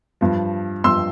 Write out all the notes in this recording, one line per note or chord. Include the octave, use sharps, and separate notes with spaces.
G2 F3
G2 F3 C6 E6